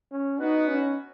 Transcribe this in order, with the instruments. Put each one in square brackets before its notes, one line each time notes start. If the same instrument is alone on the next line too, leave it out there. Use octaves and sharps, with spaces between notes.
[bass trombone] C#4
[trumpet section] B3 F#4 B4 F#5 [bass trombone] D#4
[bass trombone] C#4